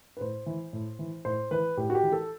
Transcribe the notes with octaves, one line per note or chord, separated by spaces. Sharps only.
B4
A2 C5
E3
A2
E3
A2 C5
E3 B4
A2 G4
F#4
G4
E3
A4